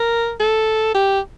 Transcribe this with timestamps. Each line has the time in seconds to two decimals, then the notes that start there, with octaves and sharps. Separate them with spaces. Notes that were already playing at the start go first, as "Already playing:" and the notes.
Already playing: A#4
0.39 A4
0.94 G4